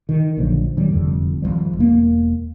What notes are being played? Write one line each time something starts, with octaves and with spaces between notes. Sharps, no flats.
D#3
A#1 D3 F3 F#3
G#2 D#3 F#3 G3
F1 F2 D3 G3
G#1 C#2 F3 G3
E1 A#3